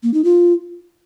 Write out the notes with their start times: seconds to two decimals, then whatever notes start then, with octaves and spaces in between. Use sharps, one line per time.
0.03 A#3
0.14 D#4
0.24 F4